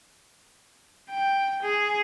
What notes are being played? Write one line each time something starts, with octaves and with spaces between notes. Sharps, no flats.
G5
G#4